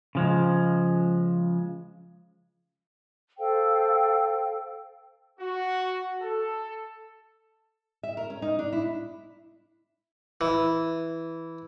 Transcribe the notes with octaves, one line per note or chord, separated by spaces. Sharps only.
C#3 F3 G#3
A4 C5 F5 G5
F#4
A4
E5
A#4
C#4
D#4
D4
E4
E3